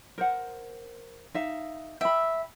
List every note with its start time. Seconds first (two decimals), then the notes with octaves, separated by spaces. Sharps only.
0.18 A#4 C5 F#5
1.34 D#4 E5 F5
2.01 E5 G5 B5